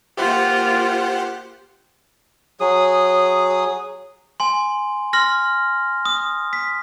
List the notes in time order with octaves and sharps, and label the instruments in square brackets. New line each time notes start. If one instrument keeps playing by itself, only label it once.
[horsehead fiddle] A#3 F4 [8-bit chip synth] G4 C5 F#5
[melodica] F#3 G#4 D#6
[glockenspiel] G#5 C6
C6 F6 A#6
D#6
B6